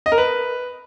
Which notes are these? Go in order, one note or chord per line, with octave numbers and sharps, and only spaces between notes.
D#5
A#4
B4